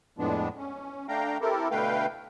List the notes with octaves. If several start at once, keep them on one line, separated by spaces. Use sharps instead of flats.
F2 A2 F3 G#3 B3 D4
C#4
A3 D4 F5 G5 A#5
C4 E4 G4 A4 A#4
B2 D3 A3 B4 F5 G5